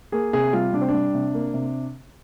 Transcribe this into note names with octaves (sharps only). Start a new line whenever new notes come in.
A#3 G#4
C3 G#4
G3 F4
C3 D4
C4
G3 D4
C3
A#3
C3